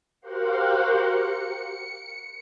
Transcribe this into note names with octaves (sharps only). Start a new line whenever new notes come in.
F#4 G4 A#4 C5 F5 F#5
C#7